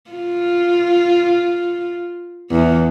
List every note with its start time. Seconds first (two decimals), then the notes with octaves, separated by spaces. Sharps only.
0.11 F4
2.51 E2